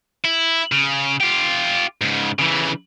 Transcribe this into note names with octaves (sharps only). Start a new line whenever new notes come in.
E4
C#3
F4 G4
G#2 C#3
C#3 E3